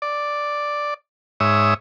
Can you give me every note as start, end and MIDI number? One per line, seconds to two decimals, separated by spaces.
0.02 0.94 74
1.40 1.74 44
1.40 1.74 73
1.40 1.74 76
1.40 1.74 87